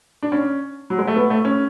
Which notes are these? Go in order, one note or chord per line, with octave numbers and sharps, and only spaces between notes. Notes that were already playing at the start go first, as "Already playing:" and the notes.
D4
C#4
F#3
G#3
A3
B3
A3
C#4